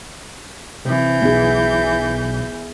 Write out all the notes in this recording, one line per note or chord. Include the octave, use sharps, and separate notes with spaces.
C3 E3 G6
B1 B3 G#4